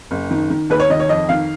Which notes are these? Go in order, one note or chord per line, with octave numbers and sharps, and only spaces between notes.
F#1
D#3
D#3
D#2 B4
C#5
D#3 D#5
C#5
F2 D#5
D#3 F5